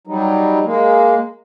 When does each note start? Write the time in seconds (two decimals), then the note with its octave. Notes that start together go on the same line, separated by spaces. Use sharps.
0.07 F#3 G3 D#4
0.65 G#3 A#3